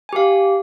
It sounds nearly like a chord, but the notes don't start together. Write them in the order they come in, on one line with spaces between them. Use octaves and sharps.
G#5 G4 F5